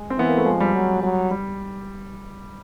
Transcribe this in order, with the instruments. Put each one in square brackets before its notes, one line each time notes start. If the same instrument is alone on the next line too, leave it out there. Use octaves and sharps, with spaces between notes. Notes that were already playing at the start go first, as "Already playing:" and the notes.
Already playing: [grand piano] G#3
C4
[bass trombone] E3 [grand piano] B3
[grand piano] A#3
A3
[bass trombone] F3 [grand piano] G#3
[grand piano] G3
[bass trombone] F#3
F#3
[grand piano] G3